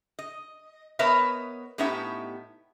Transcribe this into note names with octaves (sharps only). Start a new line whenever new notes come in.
D#5
B3 A#4 B4 C#5 D#5 E5
A2 B3 C#4 D#4 G4 E5